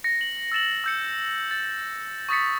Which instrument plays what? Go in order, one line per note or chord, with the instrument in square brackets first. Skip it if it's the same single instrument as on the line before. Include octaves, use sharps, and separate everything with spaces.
[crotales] A#6 C#7
F#7
E6 A6 E7 F#7
E6 G6 C#7
A6
C#6 D#6 A6 B6 C#7